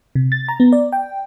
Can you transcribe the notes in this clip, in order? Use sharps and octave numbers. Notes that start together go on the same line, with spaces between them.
C3
A6
A#5
B3
D5
G5